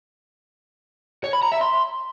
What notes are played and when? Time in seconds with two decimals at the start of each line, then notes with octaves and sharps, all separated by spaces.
1.24 C#5
1.33 B5
1.42 A#5
1.52 E5
1.61 C6